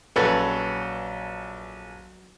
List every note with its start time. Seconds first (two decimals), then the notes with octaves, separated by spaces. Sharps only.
0.16 A#1 F#3 C#4 A4 B4